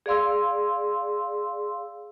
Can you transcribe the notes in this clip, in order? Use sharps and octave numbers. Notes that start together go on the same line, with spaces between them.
G#4 D5 F5 C6 E6